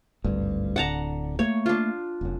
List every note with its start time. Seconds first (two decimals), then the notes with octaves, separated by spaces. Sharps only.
0.24 G#1 D2 G2
0.76 D1 D3 F#5 A5 A#5
1.39 A3 A#3 C#5
1.66 D4 F4
2.21 F1 F#2